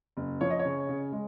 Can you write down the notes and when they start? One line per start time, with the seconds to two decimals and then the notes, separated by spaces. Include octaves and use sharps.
0.17 F#1
0.41 F3 C#5
0.50 D#5
0.59 C#5
0.65 C#3
0.89 C#3
1.12 G#3